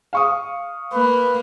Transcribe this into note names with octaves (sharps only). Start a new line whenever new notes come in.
F5 C#6 D#6
A#3 B4